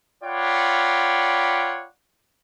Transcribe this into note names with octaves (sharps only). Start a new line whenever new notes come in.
F4 C#5 D5 F#5 G5 B5